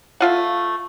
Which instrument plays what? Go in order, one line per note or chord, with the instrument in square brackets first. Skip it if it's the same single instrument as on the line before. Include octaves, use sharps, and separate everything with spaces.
[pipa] A3 F4 F#5